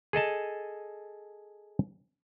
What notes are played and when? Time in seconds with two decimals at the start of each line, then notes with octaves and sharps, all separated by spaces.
0.13 G#4 A4 D#5 A5